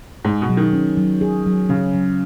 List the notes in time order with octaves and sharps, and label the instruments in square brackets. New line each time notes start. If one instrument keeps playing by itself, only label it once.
[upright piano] G#2 [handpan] G#4
[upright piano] B2
[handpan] F#3
[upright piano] D#3
[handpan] C#4
F#3
G#4
F#3
[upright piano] C#3 [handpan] C#4
[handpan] F#3